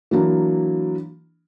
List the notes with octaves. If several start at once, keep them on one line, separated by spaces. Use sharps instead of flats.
E3 F#3 A#3 D4